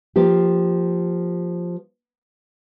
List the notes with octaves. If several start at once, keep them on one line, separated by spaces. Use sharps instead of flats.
F3 A#3 G4